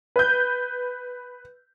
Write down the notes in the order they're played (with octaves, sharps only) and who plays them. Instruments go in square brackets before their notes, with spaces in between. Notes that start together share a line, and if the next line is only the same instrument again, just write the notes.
[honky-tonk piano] B4 G6